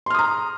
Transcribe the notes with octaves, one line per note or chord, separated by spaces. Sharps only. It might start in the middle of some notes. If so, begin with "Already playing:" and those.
A#5 C6 D#6 F6